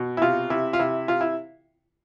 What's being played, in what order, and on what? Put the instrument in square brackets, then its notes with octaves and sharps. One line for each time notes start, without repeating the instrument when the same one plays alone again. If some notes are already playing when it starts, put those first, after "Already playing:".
Already playing: [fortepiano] B2
E4
C3 F4
C3 E4
F4
C3 E4
C3 F4
E4